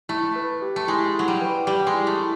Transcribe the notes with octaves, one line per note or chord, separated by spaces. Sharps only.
A3 E4
B4
G4
A3
G#3 E4
F#3 E4
G3
B4
G3 G4
G#3
E4
A3
E4